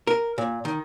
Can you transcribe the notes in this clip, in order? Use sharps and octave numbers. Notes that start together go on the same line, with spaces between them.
A#4
A#2
D#3